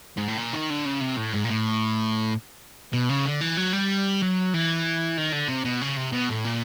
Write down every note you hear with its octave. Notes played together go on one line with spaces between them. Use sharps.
G#2
A2
A#2
D#3
D3
C#3
C3
A2
G#2
A#2
A2
B2
C#3
D3
E3
F#3
G3
F#3
E3
D#3
D3
C3
B2
C#3
C3
B2
A2
A#2